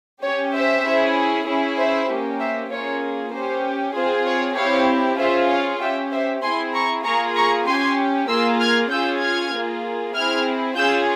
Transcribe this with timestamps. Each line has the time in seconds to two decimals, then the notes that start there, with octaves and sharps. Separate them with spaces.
0.23 C#4 G4 C#5
0.54 C5 E5
0.85 C#4 E4 G#4
1.47 C#4 E4 G#4
1.78 C5 E5
2.09 A#3 C#4 G4
2.40 C5 E5
2.71 A#3 C#4 F4 G#4 C#5
3.33 C#4 G4 C5
3.95 C4 F4 G#4 C5
4.26 C#5
4.57 C4 E4 G4 C#5 F5
5.19 C#4 F4 G#4 C5 E5
5.50 C#5 F5
5.81 C#4 G4 E5 G5
6.12 C5 E5
6.43 C4 E4 G#4 G#5 C6
6.74 A#5 C#6
7.04 A#3 F4 G#4 A#5 C#6
7.35 A#5 C#6
7.67 C#4 G4 G#5 C6
8.29 A#3 F4 G#4 C6 E6
8.60 F6 G#6
8.91 C#4 F4 G#4 E6 G6
9.22 F6 G#6
9.53 A#3 F4 G#4
10.15 C4 E4 G#4 F6 G#6
10.76 C#4 F4 G#4 E6 G6